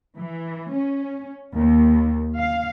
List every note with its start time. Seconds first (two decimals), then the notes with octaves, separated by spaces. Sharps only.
0.18 E3
0.71 C#4
1.54 D#2
2.37 F5